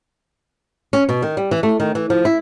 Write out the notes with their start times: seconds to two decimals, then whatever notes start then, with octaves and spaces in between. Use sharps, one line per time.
0.93 C#4
1.09 B2
1.22 D#3
1.37 G3
1.51 E3
1.63 A3
1.80 D#3
1.95 E3
2.10 F3
2.25 E4